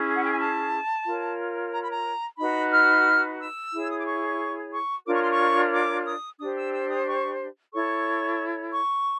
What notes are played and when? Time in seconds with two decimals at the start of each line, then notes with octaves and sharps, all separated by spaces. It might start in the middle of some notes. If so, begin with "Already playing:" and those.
Already playing: C#4 E4 G#4
0.15 F#5
0.23 G5
0.30 G#5
0.39 A5
1.05 F4 A#4 C#5
1.72 A#5
1.81 B5
1.90 A#5
2.38 D#4 F#4 B4 B5
2.72 F6
3.39 E6
3.72 E4 G#4 C#5
3.90 D#6
3.98 D6
4.06 C#6
4.72 C#6
5.06 D4 F4 A#4 C#5 D6
5.14 C#6
5.22 C6
5.30 C#6
5.73 D6
6.06 D#6
6.39 D4 G4 C5 D#6
6.56 E6
6.73 E6
6.90 D#6
7.06 C#6
7.73 E4 A4 C#5 C#6
8.73 C#6